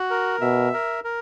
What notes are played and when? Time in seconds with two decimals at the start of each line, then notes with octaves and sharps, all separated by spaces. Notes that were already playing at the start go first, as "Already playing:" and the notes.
Already playing: F#4
0.10 A#4
0.41 B2 E5
0.73 A#4
1.04 A#4